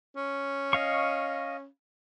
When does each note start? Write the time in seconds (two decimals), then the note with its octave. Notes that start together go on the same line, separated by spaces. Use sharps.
0.16 C#4
0.73 D#5 F5 C#6